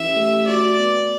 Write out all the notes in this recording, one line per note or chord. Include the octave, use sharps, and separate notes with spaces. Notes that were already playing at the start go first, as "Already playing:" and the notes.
Already playing: E3 C#4 G4 E5
A3
F#4 D5
B3